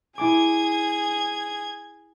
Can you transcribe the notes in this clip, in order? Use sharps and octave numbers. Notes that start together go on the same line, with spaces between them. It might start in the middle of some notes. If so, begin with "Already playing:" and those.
E4 G#4 G#5 D6 G#6